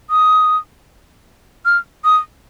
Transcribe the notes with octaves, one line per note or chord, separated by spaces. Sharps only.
D#6
F6
D#6